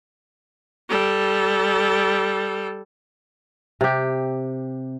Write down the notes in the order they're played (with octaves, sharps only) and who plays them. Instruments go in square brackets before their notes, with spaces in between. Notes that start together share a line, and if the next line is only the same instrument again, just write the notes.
[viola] G3 A4
[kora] C3 G4